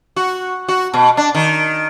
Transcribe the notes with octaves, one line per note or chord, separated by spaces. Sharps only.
F#4
F#4
B2
D4
D#3